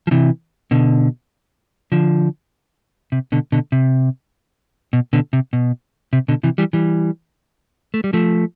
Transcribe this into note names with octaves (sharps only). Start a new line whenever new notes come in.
F3
C3 E3
B2 D3
D3 F3
C3
B2 D3
B2 D3
C3
B2
B2 D3
C3
B2
C3
B2 D3
C3 E3
E3 G3
E3 G3
A3
G3
F3 A3